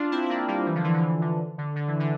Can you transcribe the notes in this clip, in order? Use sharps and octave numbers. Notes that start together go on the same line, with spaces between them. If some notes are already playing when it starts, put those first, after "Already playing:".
Already playing: D4 F4
C4 E4
E4
A#3 D4
G3 A#3
E3 G3
D3 F3
E3
D3
E3
D3
D3
D3
E3
D3